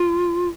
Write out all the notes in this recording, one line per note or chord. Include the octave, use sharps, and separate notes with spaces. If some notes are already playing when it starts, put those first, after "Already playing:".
Already playing: F4